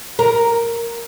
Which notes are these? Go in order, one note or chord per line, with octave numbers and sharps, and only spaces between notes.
A#4